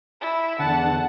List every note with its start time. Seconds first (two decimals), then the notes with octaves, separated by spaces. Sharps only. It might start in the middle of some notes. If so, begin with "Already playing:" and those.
0.21 E4
0.59 E2 D3 F#5 A5